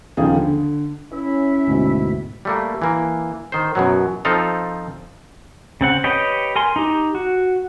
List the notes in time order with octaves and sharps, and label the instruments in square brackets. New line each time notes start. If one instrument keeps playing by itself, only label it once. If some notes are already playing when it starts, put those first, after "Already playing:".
[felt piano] D#1 C#3 F3 D#4 G#4
D3
[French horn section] C#4 [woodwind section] E4 E5
[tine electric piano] D2 G#2 B2
[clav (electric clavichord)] G3 A3 A#3
E3 A#3
D#3 C5
F#2 B2 F#3
F3 C4 D#4 F4 A4 F5
[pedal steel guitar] C#3 C4 F#5
G4 B4 C#5 D#5 G5
A#4 G#5 C6
D#4 G4
F#4